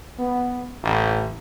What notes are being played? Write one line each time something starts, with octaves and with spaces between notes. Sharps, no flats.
B3
A1